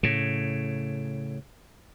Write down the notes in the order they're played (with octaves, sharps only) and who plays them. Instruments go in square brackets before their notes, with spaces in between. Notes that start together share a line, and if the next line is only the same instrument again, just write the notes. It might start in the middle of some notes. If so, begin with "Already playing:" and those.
[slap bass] A2 C#3